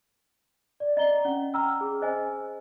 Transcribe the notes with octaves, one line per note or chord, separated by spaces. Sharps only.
D5
D5 D#5 A#5 G7
C#4 F#5
G5 A#5 E6 F6
G#4
C5 D#5 G#5